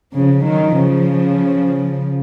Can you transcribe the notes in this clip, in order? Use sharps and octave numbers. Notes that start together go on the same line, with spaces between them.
C#3 F3
D#3 F#3
C#3 F3